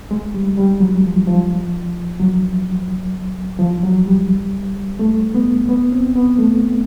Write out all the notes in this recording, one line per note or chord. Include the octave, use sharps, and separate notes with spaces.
G#3
G3
G3
F#3
F3
F3
F#3
F3
F#3
G3
A3
B3
B3
C4
B3
A3